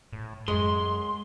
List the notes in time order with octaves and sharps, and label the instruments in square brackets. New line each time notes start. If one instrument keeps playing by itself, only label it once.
[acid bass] A2
[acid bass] F#2 [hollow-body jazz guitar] G#3 [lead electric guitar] C6